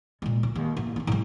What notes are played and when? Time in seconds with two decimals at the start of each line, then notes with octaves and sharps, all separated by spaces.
0.22 A#2 G#3
0.43 D2
0.56 D#2
0.77 A1
0.96 B3 E4
1.07 A2 G3